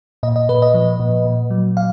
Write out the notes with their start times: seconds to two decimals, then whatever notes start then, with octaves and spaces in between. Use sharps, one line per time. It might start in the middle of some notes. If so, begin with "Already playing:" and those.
0.23 A#2 D#5
0.36 D#5
0.49 A#2 B4
0.62 D#5
0.74 F3
1.00 A#2
1.25 A#2
1.50 F#3
1.77 F#3 F5